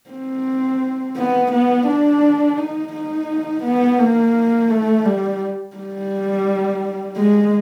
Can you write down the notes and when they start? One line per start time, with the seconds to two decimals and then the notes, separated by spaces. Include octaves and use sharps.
0.11 C4
1.17 B3
1.52 B3
1.87 D4
2.58 D#4
2.93 D#4
3.63 B3
3.99 A#3
4.70 A3
5.05 G3
5.76 G3
7.17 G#3